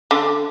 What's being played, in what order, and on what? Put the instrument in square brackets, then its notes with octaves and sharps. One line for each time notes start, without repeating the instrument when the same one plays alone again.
[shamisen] D3